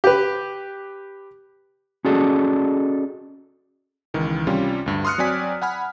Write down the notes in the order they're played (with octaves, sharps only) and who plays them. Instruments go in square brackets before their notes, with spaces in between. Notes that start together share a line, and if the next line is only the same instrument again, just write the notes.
[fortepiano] G4 B4
[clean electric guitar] C#4 F#4 G#4 A4 D5 D#5
[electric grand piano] C#2 D#3 E3
C3 G3 C#4 F4
D2 G2
C6 D#6 F6 F#6 C#7
F#3 C4 D5 G#5 B6
F#5 G#5 B5 F6